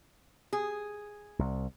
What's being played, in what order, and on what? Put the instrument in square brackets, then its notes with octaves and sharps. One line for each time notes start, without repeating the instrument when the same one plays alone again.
[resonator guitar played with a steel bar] G#4
[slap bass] C2